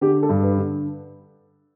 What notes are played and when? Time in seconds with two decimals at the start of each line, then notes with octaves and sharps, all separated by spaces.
0.01 D3 G4
0.23 A4
0.29 G2
0.43 B4
0.58 D3